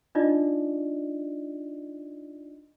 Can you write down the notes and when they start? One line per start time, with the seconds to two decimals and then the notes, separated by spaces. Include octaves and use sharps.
0.15 D4 D#4 F4 D5 D#5